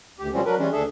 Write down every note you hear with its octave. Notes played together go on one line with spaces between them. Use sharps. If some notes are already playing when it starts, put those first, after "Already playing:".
D2 G4
B2 F3 G3 G#3 C4 C#4
F#3 D4 A#4 B4
E3 G3 G#3 C#4 D4
D2 D4 G#4 A4 E5